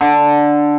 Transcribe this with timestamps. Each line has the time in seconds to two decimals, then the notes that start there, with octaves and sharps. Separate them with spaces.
0.01 D3